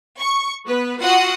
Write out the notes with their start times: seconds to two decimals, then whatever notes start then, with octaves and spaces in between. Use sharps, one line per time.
0.19 C#6
0.68 B3 B4
1.00 F4 F#4 F#5 C6 D#6